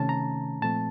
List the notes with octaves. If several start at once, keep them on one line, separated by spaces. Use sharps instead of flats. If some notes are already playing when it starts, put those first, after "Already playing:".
Already playing: C3 D#3 A3 C#4 A5
A#5
A#2 F3 A3 C4 A5